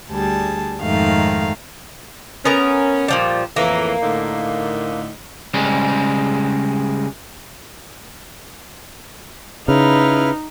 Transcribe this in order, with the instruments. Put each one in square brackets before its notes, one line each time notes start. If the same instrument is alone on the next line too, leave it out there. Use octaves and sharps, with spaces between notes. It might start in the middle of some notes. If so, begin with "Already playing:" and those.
[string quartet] D2 G3 G#4 A5
F2 G#2 D#3 A3 F5
[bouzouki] B3 A#4 A#5 [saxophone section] C#4
[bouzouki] A#2 F3 G3
[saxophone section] F2 A2 E3 [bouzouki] A#3
[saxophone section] A2 D3 D#4
[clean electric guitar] C#3 G3 G#3 C4
[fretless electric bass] C#3 [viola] D#4 [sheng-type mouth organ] E4 B4 F6